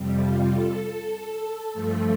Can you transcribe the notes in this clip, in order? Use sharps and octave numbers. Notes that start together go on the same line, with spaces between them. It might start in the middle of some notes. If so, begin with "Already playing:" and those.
Already playing: F2 C3 G3
F4
A4
G2 F3 A3